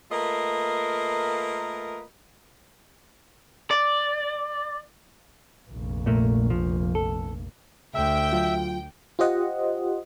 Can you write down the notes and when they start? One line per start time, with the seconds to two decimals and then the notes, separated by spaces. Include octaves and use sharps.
0.12 A3 A#3 F4 A#4 B4 D#5
3.71 D5
5.70 F1 A#1
6.06 A#2 A3 A#3
6.50 F3
6.95 A4
7.95 D2 E5 G5
8.32 F#3 F4
9.19 F4 G4 C5 D#5 F#5